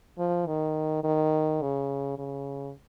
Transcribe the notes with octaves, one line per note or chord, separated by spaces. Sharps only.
F3
D#3
D#3
C#3
C#3